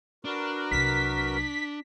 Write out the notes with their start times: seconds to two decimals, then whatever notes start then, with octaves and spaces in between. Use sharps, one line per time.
0.25 D4 F#4 A#4 B4
0.71 C2 F#3 B6